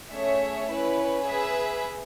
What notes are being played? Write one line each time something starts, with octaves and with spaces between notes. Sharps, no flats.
A3 C#4 G#4 C#5 E5
C#4 E4 B4
G#4 B4 E5